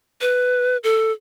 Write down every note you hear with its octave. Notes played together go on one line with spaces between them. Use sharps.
B4
A4